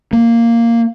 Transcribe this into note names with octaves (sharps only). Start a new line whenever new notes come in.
A#3